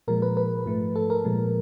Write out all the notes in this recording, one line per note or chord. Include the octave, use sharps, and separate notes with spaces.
A#2 F3 G#3 A#4
B4
B4
G#2 F3 A3
A4
A#4
A#2 F3 G#3